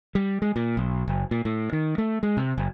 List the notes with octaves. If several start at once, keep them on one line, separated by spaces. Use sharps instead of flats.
G3
G#3
A#2
B1
F#1
A#2
A2
D#3
A3
G#3
C3
F#1